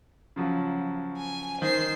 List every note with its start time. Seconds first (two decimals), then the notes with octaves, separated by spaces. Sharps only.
0.36 C#3 F3 F#3
1.18 G#5
1.62 D#3 C5 C7